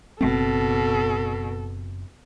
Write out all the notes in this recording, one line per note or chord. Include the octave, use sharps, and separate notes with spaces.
F#1 B2 C4 A4